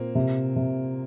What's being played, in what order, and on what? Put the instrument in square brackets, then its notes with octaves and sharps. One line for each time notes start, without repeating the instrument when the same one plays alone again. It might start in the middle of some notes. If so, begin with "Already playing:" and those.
Already playing: [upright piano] A#2 [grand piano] A#3 C4
[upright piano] C3
C3